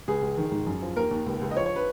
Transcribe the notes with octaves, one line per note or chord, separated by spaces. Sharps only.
C#2 G#4
C#2
D#3
G#2
F#2
F3
D#2 A#4
D#2
C#2
C#2
D#5
F3 C#5
C#5
B4